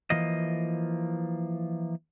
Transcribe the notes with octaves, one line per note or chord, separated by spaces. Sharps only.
E3 F3 A#3 D#5